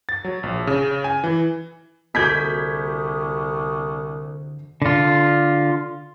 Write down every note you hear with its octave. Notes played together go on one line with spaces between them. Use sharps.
A6
F#3
A#1
C#3
G#5
E3
C2 D3 A#3 F#4 A4 G6 G#6 B6
D3 F4